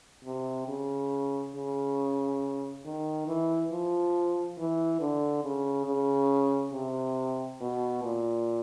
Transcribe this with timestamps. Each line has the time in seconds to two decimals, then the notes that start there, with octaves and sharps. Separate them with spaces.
0.25 C3
0.68 C#3
1.55 C#3
2.85 D#3
3.27 E3
3.72 F3
4.58 E3
5.00 D3
5.44 C#3
5.86 C#3
6.73 C3
7.61 B2
8.03 A#2